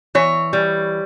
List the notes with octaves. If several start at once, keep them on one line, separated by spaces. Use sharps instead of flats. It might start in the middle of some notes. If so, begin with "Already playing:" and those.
E3 C#5
G3